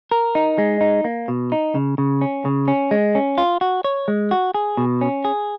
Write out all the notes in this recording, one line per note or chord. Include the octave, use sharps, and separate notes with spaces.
A#4
D#4
G#3
D#4
A#3
B2
D#4
C#3
C#3
C#4
C#3
C#4
G#3
C#4
F4
F#4
C#5
G#3
F#4
G#4
B2
C#4
G#4